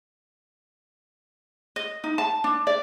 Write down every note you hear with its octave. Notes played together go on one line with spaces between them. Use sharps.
D#5
D#4
A5
D4
D5